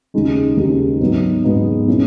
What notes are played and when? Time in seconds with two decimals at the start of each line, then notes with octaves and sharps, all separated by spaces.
0.14 D#2 C#3 G#3 D#4
0.57 D#2 C#3 G#3 D#4
1.01 G#2 F#3 B3 D#4
1.44 G#2 F#3 B3 D#4
1.88 B2 A#3 C#4 E4